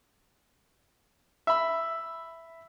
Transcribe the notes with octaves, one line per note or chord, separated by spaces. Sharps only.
E5 B5